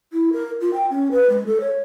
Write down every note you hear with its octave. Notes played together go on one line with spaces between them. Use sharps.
E4
A#4
F4
G5
C#4
B4
G#3
A4
C#5